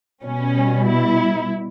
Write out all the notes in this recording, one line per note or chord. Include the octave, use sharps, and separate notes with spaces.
B2 G3 C#4
E4